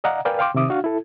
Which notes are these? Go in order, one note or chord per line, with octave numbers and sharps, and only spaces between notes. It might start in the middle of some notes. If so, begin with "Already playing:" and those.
D5 D#5 F5 F#5 A#5
A#4 B4 D5 F5 G5 G#5
F5 G5 C6 D6
C3 D#3 E5 D6 D#6
D4 F#4 F5
E4 A4